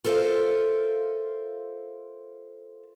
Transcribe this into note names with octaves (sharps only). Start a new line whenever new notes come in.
F4 A4 A#4 C5 E5 F5